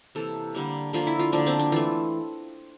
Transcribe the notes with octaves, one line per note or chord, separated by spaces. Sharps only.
C3 E3 A#3 A4
D3 G3 A#3
D3 F3 A#3 F4
E4
F4
D3 F3 A#3 D4
C4
D4
E3 A3 F4